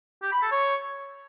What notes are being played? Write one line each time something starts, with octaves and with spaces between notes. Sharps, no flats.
G4
B5
A4
C#5